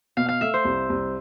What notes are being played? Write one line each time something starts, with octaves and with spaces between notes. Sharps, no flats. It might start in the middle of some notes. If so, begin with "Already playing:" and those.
B2 F5
F5
A3 E5
C5
C2
C2